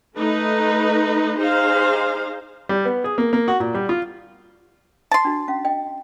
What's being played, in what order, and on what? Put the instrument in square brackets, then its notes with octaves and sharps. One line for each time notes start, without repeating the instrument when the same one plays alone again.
[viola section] A3 D#4 B4
D#4 G#4 C5 F5
[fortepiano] G3
B3
G#4
A#3
A#3
F#4
A#2
G3
F4
[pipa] A5 C6
[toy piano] D4 F#4
C#4 F5
D#5 G5